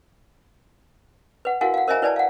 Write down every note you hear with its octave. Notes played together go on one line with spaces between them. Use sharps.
B4 F#5
E4 F#4 A#4 F5 F#5 G#5
F5 F#5
A#4 C5 D#5 E5 G#5 A#5
E4 B4 D5 G#5 A5
F5 F#5